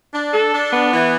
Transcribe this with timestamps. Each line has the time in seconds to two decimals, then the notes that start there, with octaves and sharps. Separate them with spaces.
0.13 D4
0.33 A4
0.53 D4
0.72 B3
0.92 E3